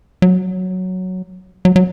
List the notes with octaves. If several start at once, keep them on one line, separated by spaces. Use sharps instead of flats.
F#3
F#3
F#3